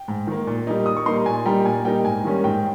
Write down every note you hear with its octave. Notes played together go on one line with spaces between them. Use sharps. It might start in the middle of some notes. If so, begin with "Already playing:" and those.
Already playing: G5
G#2
D#3 A#3
A#2
G3 A#3 D#4
A#2 D#6
C#6
G3 A#3 D#4 C6
A#5
A#2 G#5
G3 A#3 D#4 G5 A#5
A#2 G#5
G3 A#3 D#4 G5
G#2 G#5
D#3 G3 A#3 C#4
G#2 G5